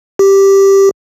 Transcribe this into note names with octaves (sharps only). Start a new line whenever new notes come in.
G4